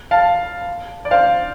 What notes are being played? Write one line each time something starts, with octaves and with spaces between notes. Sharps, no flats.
F5 A5
D5
C5 F5